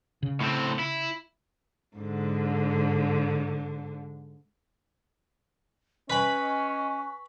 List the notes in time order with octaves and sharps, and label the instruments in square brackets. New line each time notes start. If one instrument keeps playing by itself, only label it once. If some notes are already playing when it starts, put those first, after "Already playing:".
[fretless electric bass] C#3
[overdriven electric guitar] A2 C4
E4
[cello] G#2 D3
[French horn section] C#4 D#5 [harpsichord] B4 B5 [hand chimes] G#5 F#6 B6 [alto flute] C#6